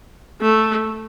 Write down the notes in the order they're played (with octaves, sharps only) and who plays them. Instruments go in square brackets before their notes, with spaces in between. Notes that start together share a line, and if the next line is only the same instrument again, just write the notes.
[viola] A3